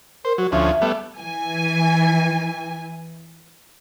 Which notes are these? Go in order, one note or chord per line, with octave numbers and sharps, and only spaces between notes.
A#4 C5
F#3 F#4
D2 F3 C#4 E5
G3 A3 B3
E3 G#5